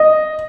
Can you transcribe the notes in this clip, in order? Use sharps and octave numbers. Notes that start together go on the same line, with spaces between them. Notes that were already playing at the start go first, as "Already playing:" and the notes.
Already playing: D#5